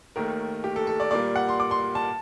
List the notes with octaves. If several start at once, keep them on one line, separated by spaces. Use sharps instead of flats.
D#2 D#3 A3 A#4
G4
A4
A4
D5
A#2 G3 A#3 D5
F#5
C6
D6
C6
A5